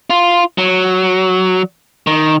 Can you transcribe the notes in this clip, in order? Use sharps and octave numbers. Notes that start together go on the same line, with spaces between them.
F4
F#3
D#3